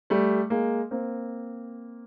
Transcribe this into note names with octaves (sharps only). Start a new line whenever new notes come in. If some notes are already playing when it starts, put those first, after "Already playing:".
G3 A3
G#3 A#3
A#3 C4